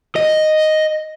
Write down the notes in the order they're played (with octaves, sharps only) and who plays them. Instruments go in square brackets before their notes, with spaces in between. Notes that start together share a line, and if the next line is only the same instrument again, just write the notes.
[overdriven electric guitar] D#5